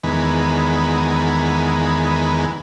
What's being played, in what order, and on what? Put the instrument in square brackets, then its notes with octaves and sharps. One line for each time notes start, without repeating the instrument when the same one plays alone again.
[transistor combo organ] E2 D#3 G#3 B3